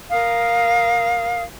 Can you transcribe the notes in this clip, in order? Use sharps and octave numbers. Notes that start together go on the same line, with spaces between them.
A#4 F5 D#6